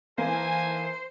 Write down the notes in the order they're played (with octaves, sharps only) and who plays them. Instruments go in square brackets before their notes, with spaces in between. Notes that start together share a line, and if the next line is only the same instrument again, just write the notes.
[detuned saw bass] E3 [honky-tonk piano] A#3 [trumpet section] D#4 A4 G#5 [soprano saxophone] C5